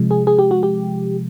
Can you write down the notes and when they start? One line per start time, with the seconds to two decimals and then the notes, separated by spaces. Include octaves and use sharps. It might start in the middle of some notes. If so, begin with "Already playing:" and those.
Already playing: C3 F3 G#3
0.11 G#4
0.27 G#4
0.39 G4
0.51 F#4
0.63 G4